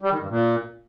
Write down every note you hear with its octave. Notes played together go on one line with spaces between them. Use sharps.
G3
D#3
G2
A#2